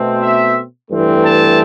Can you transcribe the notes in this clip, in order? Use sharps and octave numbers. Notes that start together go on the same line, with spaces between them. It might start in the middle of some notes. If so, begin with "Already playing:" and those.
Already playing: B2 A3 C4
E5
G2 E3 A3 C4
A5